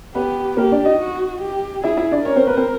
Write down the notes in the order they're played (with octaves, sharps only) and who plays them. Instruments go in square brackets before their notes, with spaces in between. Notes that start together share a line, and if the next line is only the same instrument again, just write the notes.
[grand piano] B3 B4 [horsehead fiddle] G4
[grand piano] A#3 A#4 [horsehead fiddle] G4
[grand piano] D4 D5
D#4 D#5
[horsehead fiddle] F#4
G4
[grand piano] E4 E5 [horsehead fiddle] G#4
[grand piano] E4 E5
D4 D5
[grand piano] C#4 C#5 [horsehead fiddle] A#4
[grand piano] C4 C5
B3 B4
C4 C5